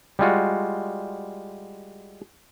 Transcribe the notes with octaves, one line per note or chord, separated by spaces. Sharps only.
G3 G#3 F4 F#4